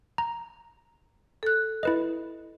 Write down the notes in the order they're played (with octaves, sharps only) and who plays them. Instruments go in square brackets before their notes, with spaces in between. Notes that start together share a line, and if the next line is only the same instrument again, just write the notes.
[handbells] A#5
[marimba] A4 F#6
[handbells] E4 B4 D#5